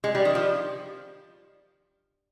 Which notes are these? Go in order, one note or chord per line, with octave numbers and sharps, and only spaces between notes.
G#3
G3
D#3
F3